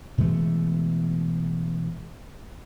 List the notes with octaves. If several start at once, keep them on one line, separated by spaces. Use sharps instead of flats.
B2 E3 G#3 A3